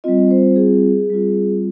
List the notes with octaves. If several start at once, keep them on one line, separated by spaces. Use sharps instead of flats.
G3 C4 F4 D#5
C5
G#4
G3 C4 F4